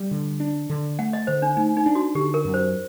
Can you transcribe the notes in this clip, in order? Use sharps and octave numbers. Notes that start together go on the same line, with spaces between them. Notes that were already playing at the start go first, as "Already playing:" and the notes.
Already playing: G3
D3
D4
D3
A3 F#5
D#5
D3 C5
D4
A3 D#4
D#4
D4
F#4
D3 G4
A#4
F#2
C5